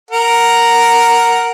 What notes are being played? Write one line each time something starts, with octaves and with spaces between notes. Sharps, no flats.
A#4 F#5